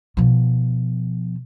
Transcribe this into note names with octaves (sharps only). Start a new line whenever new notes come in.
B2 F3